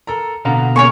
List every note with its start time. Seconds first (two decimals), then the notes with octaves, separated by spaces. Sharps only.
0.07 A4 A#4 A#5
0.45 B2 D3 B3 F5 A#5
0.76 C#3 A#3 C#5 G#5 C#6